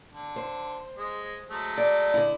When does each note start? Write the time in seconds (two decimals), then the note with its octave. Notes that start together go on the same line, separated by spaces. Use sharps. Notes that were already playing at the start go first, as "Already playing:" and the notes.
0.10 D3
0.36 C5
0.98 G#3
1.50 F#3 G#3 A3
1.78 D5
2.14 D3 E4